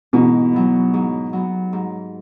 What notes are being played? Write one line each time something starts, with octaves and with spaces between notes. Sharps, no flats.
G#2 B2 E3
F#3 B3
G#2
F#3 B3
G#2